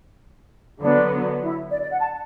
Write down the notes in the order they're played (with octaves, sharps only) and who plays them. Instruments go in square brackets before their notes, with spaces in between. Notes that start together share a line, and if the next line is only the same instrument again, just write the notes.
[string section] D3 F#3 B3 [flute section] D4
[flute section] E4
D5
D5
F#5
A5